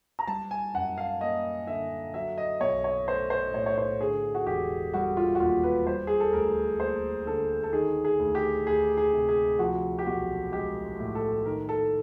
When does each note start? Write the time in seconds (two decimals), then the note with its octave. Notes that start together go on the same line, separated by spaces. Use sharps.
0.19 A#5
0.28 G3 A5
0.51 G#5
0.74 F#2 F#5
0.98 F5
1.21 A#3 D#5
1.67 D3 E5
2.14 F#3 E5
2.38 D#5
2.60 B1 C#5
2.84 C#5
3.07 A3 C5
3.30 C5
3.54 A2 C#5
3.66 C#5
3.78 C5
4.01 D3 G#4
4.35 F#4
4.47 E1 G4
4.93 G3 F#4
5.17 F4
5.35 F#4
5.40 D#2 F4
5.63 B4
5.87 G3 C5
6.07 G#4
6.20 A4
6.33 D2 A#4
6.80 A#3 C5
7.26 D3 A4
7.63 A4
7.73 D#3 G#4
8.05 G#4
8.19 D2
8.35 G4
8.67 D2 G#4
8.97 G#4
9.13 C3
9.29 G#4
9.59 F3 F#4
9.99 G4
10.06 B1 F#4
10.52 G#3 G4
10.99 A2
11.15 A4
11.46 D#3 A#4
11.69 A4